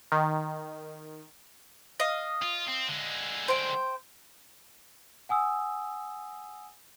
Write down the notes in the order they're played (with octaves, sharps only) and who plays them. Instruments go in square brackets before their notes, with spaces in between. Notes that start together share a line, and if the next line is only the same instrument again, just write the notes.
[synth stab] D#3
[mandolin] D#5 F5
[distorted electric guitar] F4
C4
D3 G#3
[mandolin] C5 G5
[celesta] F#5 G#5 D#6 E6